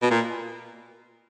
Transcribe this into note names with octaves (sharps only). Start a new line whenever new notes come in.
B2
A#2